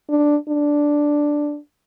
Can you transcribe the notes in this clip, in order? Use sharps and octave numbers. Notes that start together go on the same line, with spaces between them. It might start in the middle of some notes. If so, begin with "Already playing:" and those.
D4
D4